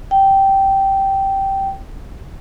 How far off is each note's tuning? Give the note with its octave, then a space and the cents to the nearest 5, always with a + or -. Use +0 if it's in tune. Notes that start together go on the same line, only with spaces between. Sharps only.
G5 -10